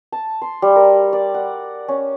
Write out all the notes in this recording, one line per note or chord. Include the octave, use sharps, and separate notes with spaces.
A5
C6
G3
A#4
D5
F#5
C#4